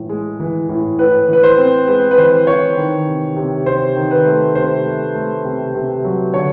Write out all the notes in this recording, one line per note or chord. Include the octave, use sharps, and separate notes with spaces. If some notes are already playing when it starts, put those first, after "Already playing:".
Already playing: A2 E3
G#3
E3
A2
A2 B4
E3 B4
C5
C4
G#3 B4
B4
E3 C5
E3 C#5
D#3
C3
C3
C3 C5
D#3
B4
A3
C3 C5
A3
A3
C3
C3
F#3
D3 C#5